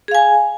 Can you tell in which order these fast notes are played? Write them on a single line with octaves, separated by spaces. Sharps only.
G#4 F5 G#5